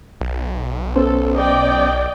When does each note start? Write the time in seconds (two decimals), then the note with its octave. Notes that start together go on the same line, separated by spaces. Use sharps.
0.21 B1
0.96 B3 C#4 A4 C5
1.36 D5 D#5 G5